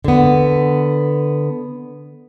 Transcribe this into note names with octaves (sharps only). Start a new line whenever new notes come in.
D3 B3